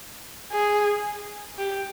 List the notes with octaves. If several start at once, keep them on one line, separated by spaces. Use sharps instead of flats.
G#4
G4